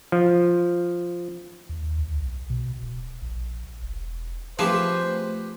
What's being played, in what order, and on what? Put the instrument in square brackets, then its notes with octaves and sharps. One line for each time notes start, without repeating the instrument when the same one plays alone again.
[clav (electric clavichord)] F3
[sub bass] D#2
D2
B1
B2
D1
A#1
E1
[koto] F3 [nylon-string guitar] A3 C4 G#4 [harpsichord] G4 B4 G#5 [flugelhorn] C5